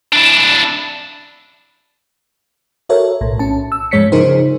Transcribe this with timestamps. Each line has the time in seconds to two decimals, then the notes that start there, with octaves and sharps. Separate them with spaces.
0.12 D4 E4
2.89 F#4 A4 A#4 C#5 E5
3.21 B1 A2
3.39 C#4 A5
3.72 E6
3.91 G#2 F3 G#3 C#5 B6 C#7
4.12 C#3 F3 D#4 G#4 A#4 C5